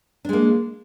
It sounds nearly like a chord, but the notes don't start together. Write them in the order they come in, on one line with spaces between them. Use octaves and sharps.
D4 G#3 A#3